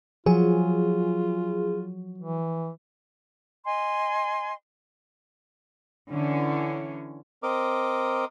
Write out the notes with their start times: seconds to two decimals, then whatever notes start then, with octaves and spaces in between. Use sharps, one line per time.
0.26 F3 F#3 F4 G#4
2.18 E3
3.65 D#5 G#5 C6
6.09 D3 E3 C#4
7.43 C4 A#4 D#5 D6